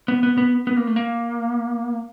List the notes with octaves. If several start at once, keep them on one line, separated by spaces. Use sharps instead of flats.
B3
B3
B3
B3
A#3
A3
A#3